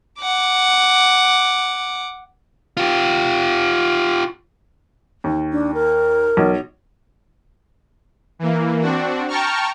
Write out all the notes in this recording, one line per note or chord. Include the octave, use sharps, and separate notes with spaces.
F#5 D6
F4 G4
D#2
D4
A#4
B1
E3 A#3
C4 D4 F#4
G5 A5 A#5 C#6 F6